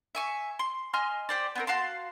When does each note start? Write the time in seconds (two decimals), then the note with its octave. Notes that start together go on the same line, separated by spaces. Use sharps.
0.15 E5 G#5 C#6
0.59 C6
0.94 D#5 G#5 C6 F6
1.29 G4 C5 D5
1.55 B3 C4 A#4
1.67 F#4 F5 A5 C6